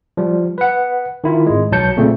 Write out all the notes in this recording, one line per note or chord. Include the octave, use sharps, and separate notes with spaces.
F3 G3
B4 F#5
D#3 E4 F4
G#1 G#3
B1 F#3 A5 G6 C#7
A#2 C#3 A3 C4